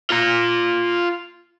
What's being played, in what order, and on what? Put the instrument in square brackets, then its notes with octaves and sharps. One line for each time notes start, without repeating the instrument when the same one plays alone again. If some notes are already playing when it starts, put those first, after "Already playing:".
[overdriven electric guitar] F4 A#5